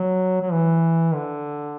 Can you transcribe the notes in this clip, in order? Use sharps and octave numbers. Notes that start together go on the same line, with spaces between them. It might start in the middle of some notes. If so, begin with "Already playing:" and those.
Already playing: F#3
F#3
E3
D3